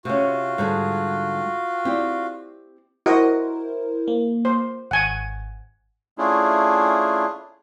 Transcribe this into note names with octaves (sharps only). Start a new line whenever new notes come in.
C3 C#4 F4 F#4
G#2 D3 G3 G#4
C4 E4 G4 D5
E4 F#4 A#4 C5 D#5
A#3
C5
G#1 F#5 G#5
A3 C#4 D4 E4 F4 G#4